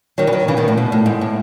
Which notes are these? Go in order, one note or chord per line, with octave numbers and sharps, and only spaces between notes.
D#3 F#3
E3
D#3 F#3
C#3 E3
B2 D#3
A2
B2
A2
G#2
A2